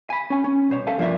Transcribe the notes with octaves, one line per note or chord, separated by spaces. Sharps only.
G#5 B5
C#4 G#5
C#4
C2 B2 C5 C#5
A4 E5 F5 G#5 A5
G2 F3 A#3 D4 F4 E5